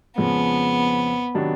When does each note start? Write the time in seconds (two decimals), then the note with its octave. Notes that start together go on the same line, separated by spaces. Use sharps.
0.17 F2 C#3 F3 G#3 B3
1.34 C3 D#3 F#3 B3 D4